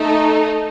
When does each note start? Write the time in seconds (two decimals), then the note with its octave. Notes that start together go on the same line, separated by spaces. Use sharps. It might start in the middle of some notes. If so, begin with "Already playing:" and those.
Already playing: A3 D#4 A4